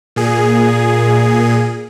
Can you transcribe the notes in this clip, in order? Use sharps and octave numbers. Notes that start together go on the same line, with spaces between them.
A#2 G#4